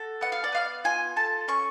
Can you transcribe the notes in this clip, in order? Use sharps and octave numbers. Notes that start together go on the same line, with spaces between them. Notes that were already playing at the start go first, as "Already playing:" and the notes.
Already playing: F#4 A4
B3 F#5
F5
D5
B3 F5
F4 G#5
A4 A5
C#4 C#6